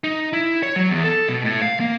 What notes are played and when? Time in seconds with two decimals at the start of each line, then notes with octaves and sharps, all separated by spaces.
0.04 D#4
0.33 E4
0.63 C#5
0.76 F#3
0.89 E2
1.04 A4
1.28 B2
1.43 A2
1.62 F5
1.80 A#3